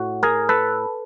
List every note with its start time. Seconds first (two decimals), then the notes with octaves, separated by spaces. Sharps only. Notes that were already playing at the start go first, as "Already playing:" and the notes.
Already playing: A2 F#4
0.23 G#4 A#4
0.49 A4 B4